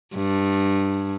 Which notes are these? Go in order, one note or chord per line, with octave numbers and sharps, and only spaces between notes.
G2